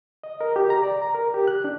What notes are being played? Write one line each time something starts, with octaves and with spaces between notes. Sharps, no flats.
D#5
A#4
G4
A#5
D5
A#5
A#4
G4
F#6
D4